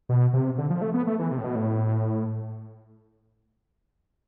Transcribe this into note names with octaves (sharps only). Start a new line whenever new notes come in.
B2
C3
D3
F3
A3
B3
A3
E3
C3
A2
B2
A2